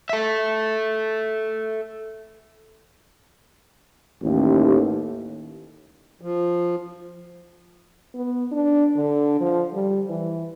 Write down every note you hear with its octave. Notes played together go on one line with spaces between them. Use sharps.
A4 E5
A1 D#2
F3
B3
D4
D3
F3
G3
E3